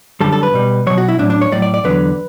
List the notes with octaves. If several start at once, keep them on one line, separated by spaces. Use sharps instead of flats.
F#2 D3 G3 A4
A4
B4
B2 G3
B2 F#3 C#5
F#4
E4
A2 F#3 D4
D4
C#5
A2 F#3 D5
D5
D5
E2 D3 F#3 B4